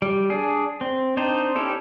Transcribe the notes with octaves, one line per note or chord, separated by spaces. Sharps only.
G3
D4 G#4
C4
C4 D4 D#4 C5
C4 C#4 E4 G4 A4